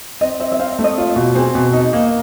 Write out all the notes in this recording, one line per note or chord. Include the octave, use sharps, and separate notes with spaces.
C4 D#5
C4 E5
E5
C4 F5
E5
A3
D#5
F4 C#5
B2
C4 G#4
B2
D#4
A#3